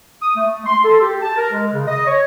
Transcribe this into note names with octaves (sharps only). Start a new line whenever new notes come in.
D#6
A3
C6
A4
G4
A5
A#4
G#3
C#3
D#5
C#5